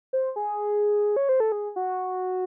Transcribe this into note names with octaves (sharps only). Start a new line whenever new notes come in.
C5
G#4
C#5
C5
A4
G#4
F#4